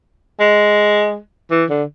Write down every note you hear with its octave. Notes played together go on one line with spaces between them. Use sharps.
G#3
E3
D3